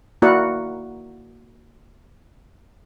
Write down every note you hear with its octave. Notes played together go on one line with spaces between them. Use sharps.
A#3 E4 F#4 A#4 D5 F#5